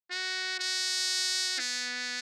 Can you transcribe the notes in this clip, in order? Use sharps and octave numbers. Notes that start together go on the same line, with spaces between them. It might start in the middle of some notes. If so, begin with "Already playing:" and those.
F#4
F#4
B3